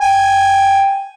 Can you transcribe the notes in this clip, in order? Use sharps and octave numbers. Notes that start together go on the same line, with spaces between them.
G5 G#5